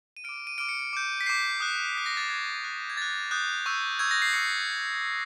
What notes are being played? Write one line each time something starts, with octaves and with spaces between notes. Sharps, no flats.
D#7
D6 F6 D7
D#7
D6 F6 D7
C#7
D7
D6 G6
B6
D6 G6 C7
D#6 F#6
D#6 F#6 B6
A#6
A6
C#6 F#6 G#6
C#6 F#6
G#6
D#6 F#6 A6
D#6 F#6 G6
C#6 E6 G6
C#6 E6 G6 G#6
A#6
C7
C#6 E6 G6 C#7